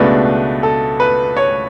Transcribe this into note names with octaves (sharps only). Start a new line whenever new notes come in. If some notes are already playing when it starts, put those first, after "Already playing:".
Already playing: C#2 B2 A3 D4 B4
A4
B4
C#5